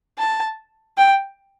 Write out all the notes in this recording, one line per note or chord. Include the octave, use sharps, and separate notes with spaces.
A5
G5